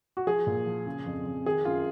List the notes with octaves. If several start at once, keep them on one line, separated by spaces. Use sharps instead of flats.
F#4
F3 G#4
A#2
F3
C#3
F2
F2
D#3 G#4
F#2 F4